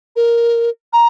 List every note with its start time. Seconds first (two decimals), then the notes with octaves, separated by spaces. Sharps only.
0.16 A#4
0.93 A#5